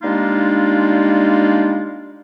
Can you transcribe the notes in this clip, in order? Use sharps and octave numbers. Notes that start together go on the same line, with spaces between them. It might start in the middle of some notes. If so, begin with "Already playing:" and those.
G3 G#3 A#3 D4 D#4 F4